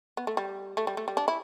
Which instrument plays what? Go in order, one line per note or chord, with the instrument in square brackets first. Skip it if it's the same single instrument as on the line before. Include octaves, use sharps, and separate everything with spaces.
[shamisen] B3
A3
G3
A3
G3
A3
G3
D4
E4